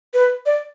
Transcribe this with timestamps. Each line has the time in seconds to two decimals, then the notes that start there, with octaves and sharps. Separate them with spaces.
0.14 B4
0.46 D5